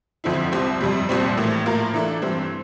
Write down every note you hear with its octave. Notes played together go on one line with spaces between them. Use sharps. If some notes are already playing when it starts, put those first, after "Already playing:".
F2 D3 F3 C4 E4
C2 C3 G3 C4
F2 C3 G3
C2 A#2 G3 C4
A2 E3 A#3
A2 F3 A#3 F4 A#4
E3 A3 D4 A4
G2 E3 G3 C4